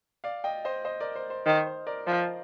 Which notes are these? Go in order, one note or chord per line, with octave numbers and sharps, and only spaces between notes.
D5 F5
D#5 G5
C5 D#5
C5 D#5
A#4 D5
C5
C5
D#3 C5
C5
A#4 D5
F3 C5 D#5
C5